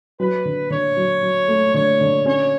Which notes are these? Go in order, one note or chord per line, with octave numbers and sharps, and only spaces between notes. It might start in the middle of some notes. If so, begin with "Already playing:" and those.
F#3 B4
D3
D3 C#5
F#3
F#3
A3
D3 C#5
D3
C#4 C#5